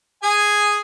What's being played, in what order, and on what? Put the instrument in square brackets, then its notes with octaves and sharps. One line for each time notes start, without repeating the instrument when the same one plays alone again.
[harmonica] G#4 G#5